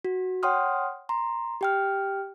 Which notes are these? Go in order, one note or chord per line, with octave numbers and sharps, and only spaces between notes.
F#4
C#5 F#5 G5 C6 D#6 F6
A#5 C6
G4 G5 F6